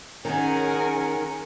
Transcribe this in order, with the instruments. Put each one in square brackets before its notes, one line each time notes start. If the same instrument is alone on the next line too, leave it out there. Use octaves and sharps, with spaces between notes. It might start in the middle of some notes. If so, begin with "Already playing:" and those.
[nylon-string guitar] D#3 [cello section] C#4 A#4 [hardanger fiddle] G#4 F#5 [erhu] G#5